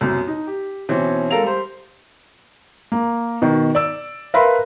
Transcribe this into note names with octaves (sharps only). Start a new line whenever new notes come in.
C2 F#2 B2
D#4
G4
B2 E3 C4 C#4
G#3 A4 A#4 F5 F7
G3 C5
A#3
B2 D#3
D5 E6
A#4 B4 E5 F5 B5 C6